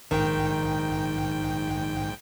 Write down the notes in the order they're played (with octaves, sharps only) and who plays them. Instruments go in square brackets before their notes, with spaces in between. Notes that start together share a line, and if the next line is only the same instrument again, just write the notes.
[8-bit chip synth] A#1 G#2 G5 [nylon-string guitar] D#3